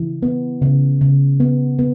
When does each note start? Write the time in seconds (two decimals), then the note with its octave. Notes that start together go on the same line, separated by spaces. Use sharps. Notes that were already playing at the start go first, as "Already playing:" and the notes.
Already playing: C#3 E3
0.23 B3
0.62 C#3
1.01 C#3
1.40 B3
1.79 B3